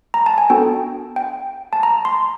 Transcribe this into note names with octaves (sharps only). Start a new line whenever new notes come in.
A#5
A5
G#5
B3 D4 F#4 A4 G5
G5
A5
A#5
C6